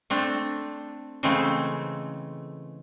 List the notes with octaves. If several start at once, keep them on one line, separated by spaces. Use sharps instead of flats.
A3 C4 D4
C#3 E3 G#3 A3 C4